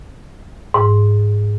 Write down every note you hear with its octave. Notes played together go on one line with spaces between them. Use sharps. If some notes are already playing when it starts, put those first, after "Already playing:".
G#2